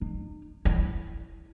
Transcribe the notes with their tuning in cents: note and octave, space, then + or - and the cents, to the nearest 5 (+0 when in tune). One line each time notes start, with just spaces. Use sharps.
D#4 -35
E4 -5